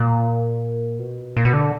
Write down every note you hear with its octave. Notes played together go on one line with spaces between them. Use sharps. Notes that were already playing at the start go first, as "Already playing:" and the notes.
Already playing: A#2
B2
A#2
B2
D3